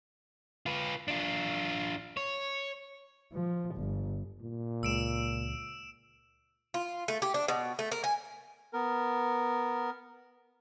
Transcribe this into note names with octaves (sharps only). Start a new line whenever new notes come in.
F4 B4
D4 F4
C#5
F3
G1
A#2
C#2 E6 D7 E7
F4
A3
G4
D4
B2
A3
A#4
G#5
B3 A#4